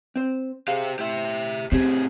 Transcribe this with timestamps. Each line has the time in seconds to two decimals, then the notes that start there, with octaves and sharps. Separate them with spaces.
0.16 C4 C5
0.68 G4 G#4 C5 F5
0.99 A2 G4 E5
1.72 A2 C4 G4 G#4 C5